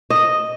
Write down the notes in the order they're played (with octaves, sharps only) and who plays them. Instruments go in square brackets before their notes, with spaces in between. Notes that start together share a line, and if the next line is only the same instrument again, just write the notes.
[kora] D#5